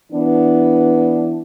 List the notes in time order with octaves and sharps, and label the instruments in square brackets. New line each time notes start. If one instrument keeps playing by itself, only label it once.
[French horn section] E3 B3 D4